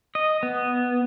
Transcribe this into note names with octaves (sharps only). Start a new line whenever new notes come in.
D#5
B3